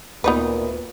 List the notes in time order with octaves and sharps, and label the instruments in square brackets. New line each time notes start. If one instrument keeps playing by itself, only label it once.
[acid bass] D2 [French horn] A#2 [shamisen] B3 D#4 B4